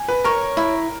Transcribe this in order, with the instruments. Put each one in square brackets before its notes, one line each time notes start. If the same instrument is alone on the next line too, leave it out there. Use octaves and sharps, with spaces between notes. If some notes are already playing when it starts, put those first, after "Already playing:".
Already playing: [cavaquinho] G#5
[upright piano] B4
[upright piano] A#4 [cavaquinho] C#5
[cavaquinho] E4